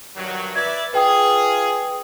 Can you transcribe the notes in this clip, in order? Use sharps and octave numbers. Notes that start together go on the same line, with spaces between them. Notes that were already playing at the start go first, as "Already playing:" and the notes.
G2 D#3 F#3
B4 D5 E5 G#6
F4 G#4 B4 G5 D#6